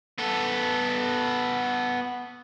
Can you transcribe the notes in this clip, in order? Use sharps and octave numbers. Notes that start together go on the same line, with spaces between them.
B3 A4